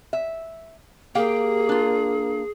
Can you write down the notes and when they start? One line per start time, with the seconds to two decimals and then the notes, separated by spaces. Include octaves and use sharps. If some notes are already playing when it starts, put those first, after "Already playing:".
0.13 E5
1.15 A#3 G4 G#4 F5 G5
1.69 D4 F4